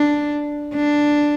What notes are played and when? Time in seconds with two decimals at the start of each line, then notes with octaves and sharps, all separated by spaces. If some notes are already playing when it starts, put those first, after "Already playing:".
Already playing: D4
0.74 D4